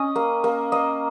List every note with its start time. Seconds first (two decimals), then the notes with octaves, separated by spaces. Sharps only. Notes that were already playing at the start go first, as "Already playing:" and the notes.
Already playing: C#4 D#5
0.16 A#3
0.44 A#3
0.72 A#3 D#5